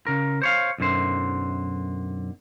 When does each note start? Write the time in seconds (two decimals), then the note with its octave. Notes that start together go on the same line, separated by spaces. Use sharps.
0.07 C#3 A#4
0.42 C5 C#5 F5
0.78 B1 F#2 D3 C5